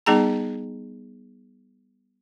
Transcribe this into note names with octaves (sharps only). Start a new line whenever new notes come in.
G3 B3 D#4 G#4 A5 A#5